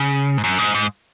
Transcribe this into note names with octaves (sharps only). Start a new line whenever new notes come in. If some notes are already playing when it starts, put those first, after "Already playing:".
Already playing: C#3
G#2
F#2
G#2
G#2